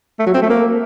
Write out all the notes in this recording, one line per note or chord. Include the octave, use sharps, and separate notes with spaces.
A3
F#3
C4
A3
A#3